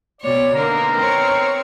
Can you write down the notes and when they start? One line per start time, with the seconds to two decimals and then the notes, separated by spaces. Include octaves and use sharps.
0.21 B2 C4 C#5 D5
0.53 D3 A#3 B3 D#4 A#4
0.96 C4 C#5